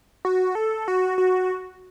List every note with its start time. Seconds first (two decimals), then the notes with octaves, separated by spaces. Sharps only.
0.25 F#4
0.55 A4
0.88 F#4
1.18 F#4